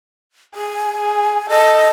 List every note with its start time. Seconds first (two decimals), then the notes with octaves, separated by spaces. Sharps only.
0.55 G#4 G#5
0.98 G#4
1.49 A4 D#5